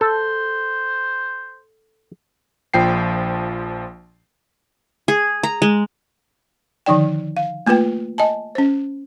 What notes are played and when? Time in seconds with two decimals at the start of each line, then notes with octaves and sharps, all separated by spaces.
0.01 A4 C5
2.74 A#1 F3 G5 C7
5.08 G#4
5.43 A#5
5.62 G#3
6.86 D3 D#3 F3 D#4 D5 G5
7.37 F5
7.67 A3 A#3 F4 B4 G5
8.18 D#5 G#5 A5
8.55 C#4 C5